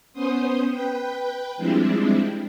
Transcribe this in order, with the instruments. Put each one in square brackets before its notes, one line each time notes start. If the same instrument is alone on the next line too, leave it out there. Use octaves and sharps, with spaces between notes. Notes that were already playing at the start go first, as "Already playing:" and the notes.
[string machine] B3 C#4 C5 C6 D#6
B4 G5
F3 G3 G#3 C4 D4 E4